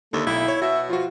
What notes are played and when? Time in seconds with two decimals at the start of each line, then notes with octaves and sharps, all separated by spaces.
0.13 D#2 D3 A3
0.27 B1 E4 E5
0.48 C#5
0.62 B2 F#4 E5
0.90 F3 F4 F#4